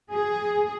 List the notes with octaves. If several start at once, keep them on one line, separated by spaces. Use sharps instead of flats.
G#4